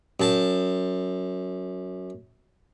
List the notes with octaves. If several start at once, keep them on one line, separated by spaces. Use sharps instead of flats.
F#2 A5